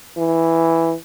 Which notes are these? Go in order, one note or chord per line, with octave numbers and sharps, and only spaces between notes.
E3